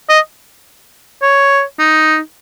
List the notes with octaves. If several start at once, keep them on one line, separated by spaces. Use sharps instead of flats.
D#5
C#5
D#4